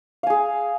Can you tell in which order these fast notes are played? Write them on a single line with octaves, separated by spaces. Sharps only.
F5 G#5 G#4